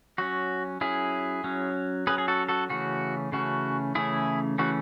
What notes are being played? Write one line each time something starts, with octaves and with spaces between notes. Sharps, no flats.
F#3 C#4 F#4
F#3 C#4 E4 G#4
F#3 C#4
F#3 C#4 G#4 B4
G#4
F#4 A4
F#4 A4
C#3 E3 A3 C#4 F#4
C#3 E3 A3 C#4 F#4
C#3 E3 A3 C#4 E4 G#4
C#3 E3 A3 C#4 F#4